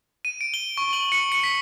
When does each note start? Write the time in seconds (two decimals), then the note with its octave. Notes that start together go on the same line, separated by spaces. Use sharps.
0.25 D#7
0.41 D7
0.54 G7
0.78 C#6
0.93 F#7
1.12 C#7
1.32 C#7
1.44 B6